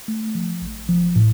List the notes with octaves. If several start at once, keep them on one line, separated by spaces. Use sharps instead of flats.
A3
F3
A1
F3
A2